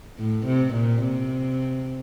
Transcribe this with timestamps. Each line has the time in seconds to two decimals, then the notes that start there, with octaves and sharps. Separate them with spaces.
0.19 A2
0.46 C3
0.74 A#2
1.03 C3